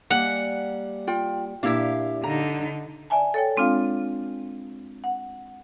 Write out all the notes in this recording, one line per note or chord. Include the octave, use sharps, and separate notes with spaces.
G3 A#3 F#5 G#5
F4 G5
A#2 D4 E4 G4 E5 F5
D3 D#4 A#5
D5 E5 G#5 A5
A4 C#5 G5
G#3 C4 D4 F4 F5
F#5